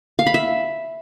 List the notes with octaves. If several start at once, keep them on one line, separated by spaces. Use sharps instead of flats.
F5
B5
E5